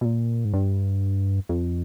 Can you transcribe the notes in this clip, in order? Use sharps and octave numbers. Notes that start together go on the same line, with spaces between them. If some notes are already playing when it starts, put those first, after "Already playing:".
B2
A#2
G#2
G2
F2